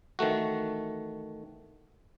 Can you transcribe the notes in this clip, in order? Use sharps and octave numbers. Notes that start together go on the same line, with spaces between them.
D#3 E3 A3 F#4